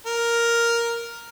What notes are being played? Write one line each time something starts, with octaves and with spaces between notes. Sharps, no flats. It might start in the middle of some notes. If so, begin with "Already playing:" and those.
A#4